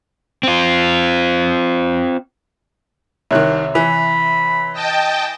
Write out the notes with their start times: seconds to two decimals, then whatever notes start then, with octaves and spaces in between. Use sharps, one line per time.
0.43 C4 F4
3.31 C2 C3 D#3 C#5 F#6
3.75 E3 B5
4.73 D#5 G5 A5